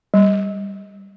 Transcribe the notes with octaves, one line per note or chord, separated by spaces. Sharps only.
G3